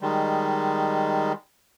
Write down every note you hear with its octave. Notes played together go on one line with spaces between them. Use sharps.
D#3 G3 G#3